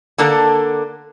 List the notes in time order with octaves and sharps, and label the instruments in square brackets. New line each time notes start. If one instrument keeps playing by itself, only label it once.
[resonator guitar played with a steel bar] D3 A#3 D4 A4